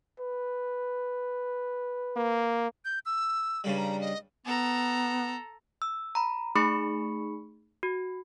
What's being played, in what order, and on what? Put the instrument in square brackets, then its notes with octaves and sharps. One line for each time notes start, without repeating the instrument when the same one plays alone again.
[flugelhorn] B4
[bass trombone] A#3
[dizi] G6
E6
[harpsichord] G2 C#3 G3
[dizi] A#5
D#5
[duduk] B3 [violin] A4 A#5
[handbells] E6
A#5 B5
A3 D#4 G#4 B5 C#6 C#7
F#4